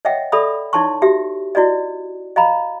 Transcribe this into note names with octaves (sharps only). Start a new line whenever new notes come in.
C#5 D#5 E5 F#5 G5
A4 D5 E5 B5 D#6
D#4 E4 C#5 A5 C6 C#6
F#4 G4 E5
E4 F#4 D5 D#5
D#5 F5 A#5 B5